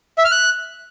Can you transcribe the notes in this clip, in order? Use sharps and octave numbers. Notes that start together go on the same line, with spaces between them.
E5
F6
F#6